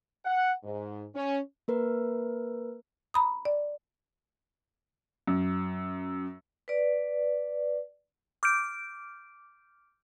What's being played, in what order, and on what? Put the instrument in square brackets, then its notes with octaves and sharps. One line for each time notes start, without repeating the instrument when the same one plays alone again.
[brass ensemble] F#5
G#2
C#4
[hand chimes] A#3 A#4 B4
[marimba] A#5 B5 D#6
D5
[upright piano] F#2
[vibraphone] B4 D5
[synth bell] D6 F6 G6 D7